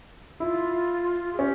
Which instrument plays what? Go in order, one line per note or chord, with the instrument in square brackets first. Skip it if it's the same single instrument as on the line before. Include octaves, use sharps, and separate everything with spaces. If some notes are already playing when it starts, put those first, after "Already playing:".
[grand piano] E4 [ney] F4
[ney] G#4
[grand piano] C#4 [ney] G4